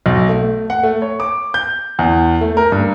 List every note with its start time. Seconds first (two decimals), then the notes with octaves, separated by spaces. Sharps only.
0.06 B1
0.29 A3
0.70 F#5
0.83 A3
1.02 C#5
1.20 D6
1.54 G6
1.99 E2
2.41 A3
2.57 A#4
2.72 G2